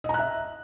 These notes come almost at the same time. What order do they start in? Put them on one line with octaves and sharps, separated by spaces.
D#5 A#5 F#6 E5